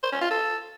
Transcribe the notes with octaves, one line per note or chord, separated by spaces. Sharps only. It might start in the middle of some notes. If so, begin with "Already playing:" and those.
C5
C#4
F4
A4